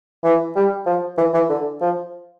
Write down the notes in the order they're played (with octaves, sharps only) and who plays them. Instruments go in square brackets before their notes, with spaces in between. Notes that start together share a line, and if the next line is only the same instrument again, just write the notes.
[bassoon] E3
G3
F3
E3
E3
D3
F3